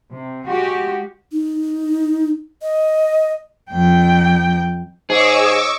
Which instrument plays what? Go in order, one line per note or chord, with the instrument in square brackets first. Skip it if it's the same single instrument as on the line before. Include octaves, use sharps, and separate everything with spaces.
[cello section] C3
G#3 F#4 G4
[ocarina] D#4
D#5
[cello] F2 G5
[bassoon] G#2 [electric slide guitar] G#4 [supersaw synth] C#5 D#5 [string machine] C#6 D6 E6